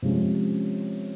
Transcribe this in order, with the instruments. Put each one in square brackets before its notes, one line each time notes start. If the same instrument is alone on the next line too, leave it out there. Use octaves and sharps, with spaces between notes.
[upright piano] C3 F3 G#3 C#4